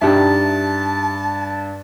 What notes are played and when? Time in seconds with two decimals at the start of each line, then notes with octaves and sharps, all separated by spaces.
0.02 G2 D#4 G4 E5 A5